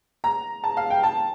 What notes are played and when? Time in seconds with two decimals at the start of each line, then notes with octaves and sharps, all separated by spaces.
0.24 A#5
0.64 A5
0.77 F5
0.90 G5
1.03 A5